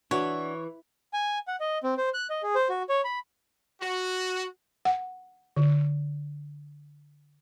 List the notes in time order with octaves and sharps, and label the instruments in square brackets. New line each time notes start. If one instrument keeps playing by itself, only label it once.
[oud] E3 [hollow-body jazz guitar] D4 F#4 [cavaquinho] C#5
[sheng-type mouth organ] G#5
F#5
D#5
C4
C5
F#6
D#5
G#4
C5
F#4
C#5
B5
[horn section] F#4
[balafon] F#5
D3